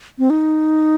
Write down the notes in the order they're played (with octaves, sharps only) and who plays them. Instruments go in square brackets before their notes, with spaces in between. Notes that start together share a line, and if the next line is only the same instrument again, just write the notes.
[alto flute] C4
D#4